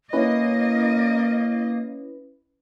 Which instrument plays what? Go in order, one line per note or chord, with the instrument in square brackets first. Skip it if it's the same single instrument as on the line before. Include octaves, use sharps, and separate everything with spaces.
[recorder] A#3 [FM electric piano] C#4 E4 B4 [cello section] D#5